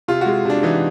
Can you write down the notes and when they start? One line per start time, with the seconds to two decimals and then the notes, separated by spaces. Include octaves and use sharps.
0.08 C3 F4
0.21 G#3 F#4
0.45 C3 D4
0.63 E3 D#4